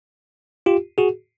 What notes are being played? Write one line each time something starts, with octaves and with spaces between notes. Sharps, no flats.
F4 G4
F#4 G#4